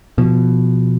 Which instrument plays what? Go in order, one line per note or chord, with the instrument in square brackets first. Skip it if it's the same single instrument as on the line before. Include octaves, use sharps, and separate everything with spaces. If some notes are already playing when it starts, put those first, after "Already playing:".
[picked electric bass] B2 F3